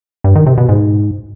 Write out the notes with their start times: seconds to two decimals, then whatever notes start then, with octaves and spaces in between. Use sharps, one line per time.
0.24 G2
0.35 D#3
0.47 C3
0.58 B2
0.69 G#2